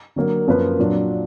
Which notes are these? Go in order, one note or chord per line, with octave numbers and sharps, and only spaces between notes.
D3 F#3 A#3
F#2 F3 A#3 F4 B4
A#2 F#3 D4 F4